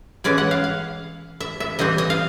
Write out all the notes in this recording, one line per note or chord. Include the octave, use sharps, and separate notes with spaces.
E3 G#3 C#4 D5
F#5
F5
F5
E5
E5
E3 G3 C4 D#5
D#5
F5